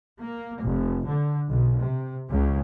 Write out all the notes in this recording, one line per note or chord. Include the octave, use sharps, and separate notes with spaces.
A#3
F1
D3
B1
C3
C#2